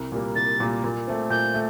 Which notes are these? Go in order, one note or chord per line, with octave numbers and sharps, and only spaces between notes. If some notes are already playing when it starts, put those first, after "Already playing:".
Already playing: C2
A#2 G3 A#3
C2 A6
A#2 G3 A#3
A#2
A3 C4
A#2 G6
A3